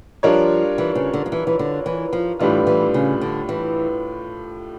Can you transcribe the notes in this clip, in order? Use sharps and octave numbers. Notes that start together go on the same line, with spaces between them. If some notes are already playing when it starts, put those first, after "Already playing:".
F3 G3 D4 F4 A#4 C#5
E3
C#3
D3
F3
E3
E3
D3
E3
F3
A2 E3 G3 D4 F4
E3
C#3
D3
E3